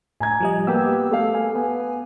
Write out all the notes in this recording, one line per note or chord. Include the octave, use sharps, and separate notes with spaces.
A2 G#5 A#5 G#6
F3 G3 D#5
A#3 B3 G4 E6
A3 F5
G#5
B3